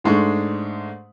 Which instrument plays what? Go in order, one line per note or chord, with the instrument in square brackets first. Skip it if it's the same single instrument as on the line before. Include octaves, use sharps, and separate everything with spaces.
[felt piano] G#2 G#3 A3 D4 C#6